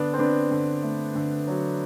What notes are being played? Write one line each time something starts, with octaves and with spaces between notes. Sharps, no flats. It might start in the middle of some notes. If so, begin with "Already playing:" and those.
Already playing: D3 B3 D4
C4
D3 B3 D4
D3
A3
D3
F#3